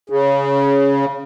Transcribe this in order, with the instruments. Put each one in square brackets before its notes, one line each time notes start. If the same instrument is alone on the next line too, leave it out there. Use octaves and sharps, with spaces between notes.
[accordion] C#3